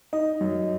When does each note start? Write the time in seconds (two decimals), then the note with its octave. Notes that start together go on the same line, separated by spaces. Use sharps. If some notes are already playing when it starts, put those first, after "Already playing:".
0.13 D#4 D#5
0.41 F#2